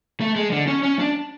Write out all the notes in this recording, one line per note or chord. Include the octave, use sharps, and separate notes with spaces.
A3
G#3
D3
C#4
C#4
D4